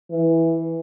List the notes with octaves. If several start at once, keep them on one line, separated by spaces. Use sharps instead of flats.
E3